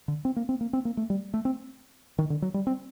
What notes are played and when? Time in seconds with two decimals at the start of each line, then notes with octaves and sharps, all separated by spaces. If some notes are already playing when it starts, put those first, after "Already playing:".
0.08 D3
0.25 C4
0.36 A#3
0.49 C4
0.61 A#3
0.73 C4
0.85 A#3
0.97 A3
1.10 G3
1.34 A3
1.45 C4
2.18 D#3
2.30 D3
2.42 F#3
2.54 G3
2.67 C4